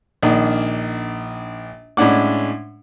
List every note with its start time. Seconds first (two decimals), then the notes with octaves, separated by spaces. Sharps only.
0.23 A#1 D#3 D4
1.97 A2 G#3 C#4 D4 F#5 D6